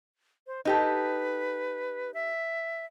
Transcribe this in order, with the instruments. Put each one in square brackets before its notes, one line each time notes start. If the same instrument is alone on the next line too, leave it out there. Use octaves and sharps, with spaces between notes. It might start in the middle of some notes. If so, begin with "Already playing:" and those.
[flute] C5
[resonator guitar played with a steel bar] D#4 G4 A4 [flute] B4
[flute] E5